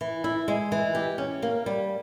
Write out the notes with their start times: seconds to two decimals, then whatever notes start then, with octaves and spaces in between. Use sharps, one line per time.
0.01 E3
0.24 E4
0.48 G#3
0.72 E3
0.95 G4
1.18 C#4
1.42 A#3
1.66 G3